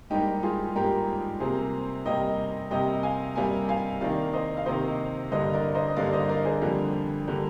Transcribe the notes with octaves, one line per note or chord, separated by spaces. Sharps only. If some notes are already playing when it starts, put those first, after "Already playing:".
G#2 G3 A#3 D#4 G4
F4 G#4
G#2 G3 A#3 G4 A#4
C3 G3 A#3 G#4 C5
C3 G3 A#3 D#5 G5
C3 G3 A#3 D#5 G5
F5 G#5
C3 G3 A#3 F5 G#5
F5 G#5
C3 D#3 A#3 D5 F5
C5 D#5
F5
C3 D#3 A#3 C5 D#5
G2 D3 G3 A#3 C5 D#5
A#4 D5
C5 D#5
D#5
G2 D3 G3 A#3 D5 F5
C5 D#5
A#4 D5
G#4 C5
F2 D3 G3 A#3
D3 G3 A#3